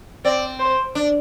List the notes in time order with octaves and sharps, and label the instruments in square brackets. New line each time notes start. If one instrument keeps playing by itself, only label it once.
[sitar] C4 [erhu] D5
[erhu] C5
[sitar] D4